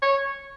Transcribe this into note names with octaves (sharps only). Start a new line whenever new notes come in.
C#5